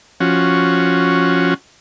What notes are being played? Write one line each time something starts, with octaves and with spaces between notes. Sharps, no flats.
F3 C#4 F#4